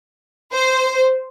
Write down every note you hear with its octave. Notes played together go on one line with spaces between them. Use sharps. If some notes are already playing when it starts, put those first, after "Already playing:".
C5